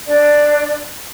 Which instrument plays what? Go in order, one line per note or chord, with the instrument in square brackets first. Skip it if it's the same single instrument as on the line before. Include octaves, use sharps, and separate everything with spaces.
[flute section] D4 D5